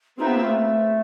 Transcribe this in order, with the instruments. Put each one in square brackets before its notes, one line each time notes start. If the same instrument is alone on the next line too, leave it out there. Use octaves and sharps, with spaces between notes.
[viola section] C4 F4 G#4 B4 E5 [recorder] D#4
[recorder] B3
A#3
A3